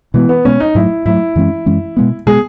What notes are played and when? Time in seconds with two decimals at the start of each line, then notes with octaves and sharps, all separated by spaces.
0.14 B2 E3 G#3 B3
0.29 B3
0.45 B2 G#3 B3 C#4
0.60 D#4
0.75 G#2 F#3 A3 E4
1.05 G#2 F#3 A3 E4
1.36 F#2 E3 G#3 C#4
1.66 F#2 E3 G#3 C#4
1.97 B2 G#3 B3
2.26 B2 G#3 B3 G#4